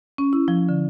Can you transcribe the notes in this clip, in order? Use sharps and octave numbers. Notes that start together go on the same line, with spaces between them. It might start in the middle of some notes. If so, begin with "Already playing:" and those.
C#4
E4
F3
D3